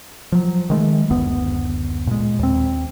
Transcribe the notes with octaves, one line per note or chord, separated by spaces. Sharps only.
F3 F#3
D#3 G#3 A3
F#1 D2 B3
A#2 G#3
D#2 C4